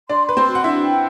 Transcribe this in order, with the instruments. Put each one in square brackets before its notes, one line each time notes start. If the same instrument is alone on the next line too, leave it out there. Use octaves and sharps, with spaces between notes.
[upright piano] D4 D5 [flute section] C6
[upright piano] B4 [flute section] C6
[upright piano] C4 C5
[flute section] F#4
[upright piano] F#5
[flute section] D4 [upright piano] E4 E5
[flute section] G5